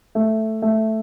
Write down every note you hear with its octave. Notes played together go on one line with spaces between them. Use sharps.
A3
A3